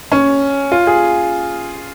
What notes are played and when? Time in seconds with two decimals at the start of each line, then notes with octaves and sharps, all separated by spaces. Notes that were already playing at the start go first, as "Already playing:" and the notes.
0.12 C#4
0.72 F4
0.87 G#4